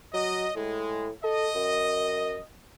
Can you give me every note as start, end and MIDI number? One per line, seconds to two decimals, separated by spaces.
0.14 0.47 54
0.14 0.53 75
0.56 1.11 45
0.56 1.07 56
1.24 1.49 69
1.24 2.44 75
1.55 2.37 42